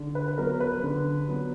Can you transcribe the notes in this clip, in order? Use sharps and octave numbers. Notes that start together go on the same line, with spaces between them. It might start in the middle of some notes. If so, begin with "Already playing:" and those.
Already playing: D3
B4
B4
F#3 B3 A#4
B4
D3
F#3 B3